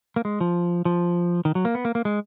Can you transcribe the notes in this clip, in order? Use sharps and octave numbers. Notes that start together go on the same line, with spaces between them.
A#3
G#3
F3
F3
D#3
F#3
A#3
B3
A#3
A#3
G#3